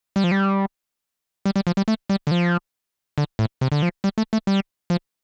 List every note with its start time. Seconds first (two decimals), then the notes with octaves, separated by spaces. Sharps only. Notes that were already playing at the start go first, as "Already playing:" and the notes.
0.16 G3
0.24 F3
0.31 G3
1.46 G3
1.56 G3
1.67 F3
1.77 G3
1.88 A3
2.09 G3
2.27 D3
2.31 F3
3.18 D3
3.39 A2
3.61 C3
3.72 D3
3.82 F3
4.04 G3
4.18 A3
4.33 A3
4.47 G3
4.90 F3